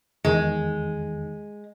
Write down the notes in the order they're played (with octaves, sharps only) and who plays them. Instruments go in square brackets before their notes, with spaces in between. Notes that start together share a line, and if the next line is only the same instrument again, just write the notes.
[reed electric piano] E2 D#3 [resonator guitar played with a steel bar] G#3